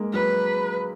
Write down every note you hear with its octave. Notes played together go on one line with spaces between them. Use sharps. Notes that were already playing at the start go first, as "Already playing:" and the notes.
Already playing: G#3 A#3
F#3 B4